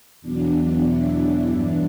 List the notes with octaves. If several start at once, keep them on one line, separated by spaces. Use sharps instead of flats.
E2 B2 F#3 D4
E4
G2 E3 D4